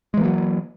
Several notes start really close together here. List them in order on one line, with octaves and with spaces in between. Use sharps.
G#3 E3 A#3 F#3